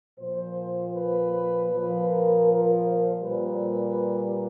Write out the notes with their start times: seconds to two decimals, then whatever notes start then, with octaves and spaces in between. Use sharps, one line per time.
0.17 A#2 F3 C5
0.93 B4
1.68 A#2 F3 B4
2.06 A#4
2.44 A#4
2.82 C5
3.19 A#2 G3 B4